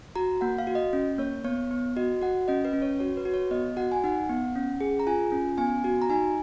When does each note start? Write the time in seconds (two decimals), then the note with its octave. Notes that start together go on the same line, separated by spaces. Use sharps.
0.16 F#4 A#5
0.41 A#3 F#5
0.58 F5
0.67 F#4
0.75 D#5
0.93 C#4
1.18 A#3 C#5
1.44 B3 C#5
1.71 B3
1.97 F#4 D#5
2.22 F#4 F#5
2.48 C#4 D#5
2.65 B4
2.73 C#4
2.82 C#5
2.99 F#4 C#5
3.17 B4
3.25 F#4
3.34 C#5
3.51 B3 D#5
3.77 F#4 F#5
3.92 G#5
4.04 D#4 F#5
4.30 B3
4.55 C#4
4.81 G#4
5.00 A#5
5.07 F4 G#5
5.32 C#4
5.58 B3 G#5
5.84 F#4
6.02 A#5
6.10 D#4 G#5